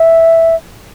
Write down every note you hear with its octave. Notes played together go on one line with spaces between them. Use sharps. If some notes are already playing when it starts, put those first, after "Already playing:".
Already playing: E5